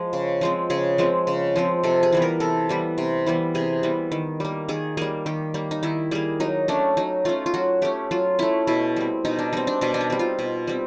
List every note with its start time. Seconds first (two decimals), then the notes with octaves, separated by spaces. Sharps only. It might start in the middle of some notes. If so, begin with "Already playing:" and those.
Already playing: F3 G#3
0.13 C#3
0.41 F3 G#3 C4
0.70 C#3 G#4
0.98 F3 G#3 C4
1.27 C#3
1.56 F3 G#3 C4
1.84 C3 A4
2.03 G#4
2.13 E3 G3 B3
2.22 A#4
2.40 C3 A4
2.69 E3 G3 B3
2.98 C3
3.27 E3 G3 B3
3.55 C3 G#4
3.83 E3 G3 B3
4.12 D#3
4.40 G3 A#3
4.69 D#3 G#4
4.97 G3 A#3 G#4
5.26 D#3 G4
5.54 G3 A#3
5.71 D#4
5.83 D#3 E4
6.11 G3 A#3 G#4
6.40 F#3 D#4
6.68 A3 C#4 D4
6.97 F#3 D#4
7.25 A3 C#4 F4
7.46 F4
7.54 F#3 F#4
7.82 A3 C#4 G4
8.11 F#3 F4
8.39 A3 C#4 E4
8.67 B2 E4
8.96 G3 C4
9.25 B2 D#4
9.39 D4
9.53 G3 C4 D#4
9.67 D4
9.81 B2 D4
9.94 D4
10.01 D#4
10.10 G3 C4
10.19 F4
10.39 B2
10.67 G3 C4